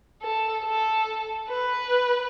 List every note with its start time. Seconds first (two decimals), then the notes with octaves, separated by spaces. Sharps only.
0.21 A4
0.64 A4
1.49 B4